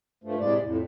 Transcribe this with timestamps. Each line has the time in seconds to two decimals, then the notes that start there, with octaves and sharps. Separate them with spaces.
0.24 G2 F3 A3
0.39 A2 C3 G#3 D5
0.63 F2 A2